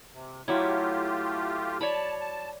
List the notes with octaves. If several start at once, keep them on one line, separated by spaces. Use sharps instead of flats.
C3
F#3 A3 E4 F4 G4
C#5 D5 A5 B5
A5